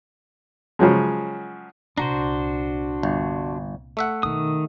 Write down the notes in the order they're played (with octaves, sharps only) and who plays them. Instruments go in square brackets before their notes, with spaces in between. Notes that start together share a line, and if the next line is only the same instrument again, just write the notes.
[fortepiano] C#3 F3 F#3 G#3
[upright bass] C2 A#2 [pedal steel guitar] D4 F#4 C5 [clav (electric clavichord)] A#5
[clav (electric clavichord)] G1
A3 E5 F#5
[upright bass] B1 B3 [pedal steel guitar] D#3 D#6